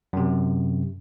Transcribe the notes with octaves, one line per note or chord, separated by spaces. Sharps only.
F#2 C3